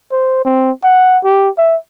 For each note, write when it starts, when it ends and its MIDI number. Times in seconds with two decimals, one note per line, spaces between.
0.12 0.40 72
0.45 0.71 60
0.84 1.18 78
1.24 1.49 67
1.58 1.76 76